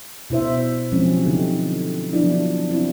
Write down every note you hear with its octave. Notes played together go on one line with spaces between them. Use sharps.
B2 E4 C5 E5
F3 F#3 G#3 C4 C#4
D3 D#4 G4
F3 F#3 B3 D4 E4
C4 D4 E4 F#4